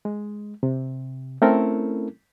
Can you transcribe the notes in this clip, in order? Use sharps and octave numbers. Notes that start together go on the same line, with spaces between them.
G#3
C3
A3 C4 C#4 E4 A4 A#4